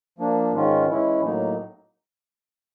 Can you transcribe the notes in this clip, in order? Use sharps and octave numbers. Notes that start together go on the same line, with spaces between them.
F3 A#3 D4
G#2 D#3 G#3 C#4 F4
E3 G#3 C#4 E4
A2 F#3 A#3 D#4